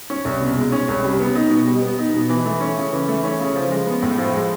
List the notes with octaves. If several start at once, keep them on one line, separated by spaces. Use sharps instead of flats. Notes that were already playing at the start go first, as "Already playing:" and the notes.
C#4
C2
B2
G#3
C#4
C2
G3
B3
D#4
B2
G3
B3
D#4
B2
E3
A3
C#4
C#3
E3
A3
C#4
C#3
F3
G#3
B3
A2
F3
G#3